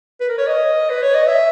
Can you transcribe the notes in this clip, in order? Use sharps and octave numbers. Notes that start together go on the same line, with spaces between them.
B4
A#4
C#5
D#5
B4
C#5
D#5
E5